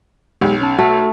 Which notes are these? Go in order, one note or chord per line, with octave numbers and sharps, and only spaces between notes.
B1 G#3 G4
C#4 A5
A3 F#4